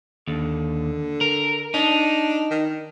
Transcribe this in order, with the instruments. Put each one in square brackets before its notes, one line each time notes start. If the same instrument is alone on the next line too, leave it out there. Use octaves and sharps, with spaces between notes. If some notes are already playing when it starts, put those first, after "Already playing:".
[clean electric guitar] D#2 [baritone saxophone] D3
[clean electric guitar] A#4
[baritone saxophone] D4 [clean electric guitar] D#4
[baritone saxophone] D#3